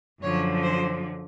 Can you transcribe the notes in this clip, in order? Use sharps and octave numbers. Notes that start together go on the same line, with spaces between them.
F#2 D3 F3 C#5
C5